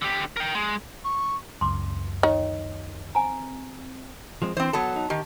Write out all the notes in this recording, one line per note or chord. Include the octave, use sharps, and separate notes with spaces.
D3 G4
A#4 G5
G#3
C#6
C#2 F#2 C6 D6
D#3 C#5
C4 G#5 A#5
F3 G#3 C4
E3 C4 C5
F#3 B3 A4 A5
D#4
D#3 G4